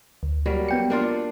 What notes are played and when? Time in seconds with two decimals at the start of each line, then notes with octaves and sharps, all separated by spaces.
0.23 D2
0.46 F#3 G3 A#3
0.69 B3 G5 C#7
0.90 A#3 D4 F4